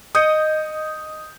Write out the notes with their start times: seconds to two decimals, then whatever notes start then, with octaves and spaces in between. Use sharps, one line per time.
0.15 D#5 D#6 G6 C#7